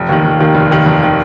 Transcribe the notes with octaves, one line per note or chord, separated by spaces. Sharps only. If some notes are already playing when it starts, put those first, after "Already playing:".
Already playing: F1
D#2 D#3
F1
D#2 D#3
F1
D#2 D#3
F1
D#3